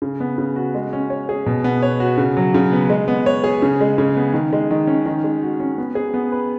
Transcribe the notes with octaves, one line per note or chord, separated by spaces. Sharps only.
C#3
B3
C#3
F#4
G#3
C#4
C#5
G#4
B2
B3
C#5
F#4
C#3
F#3
C#3
B3
G#3
B3
C#5
G#4
C#3
G#3
C#3
B3
D#3
G#3
D#3
C#4
D#3
G#3
F#4
C#4
B3
G#4
B3
B4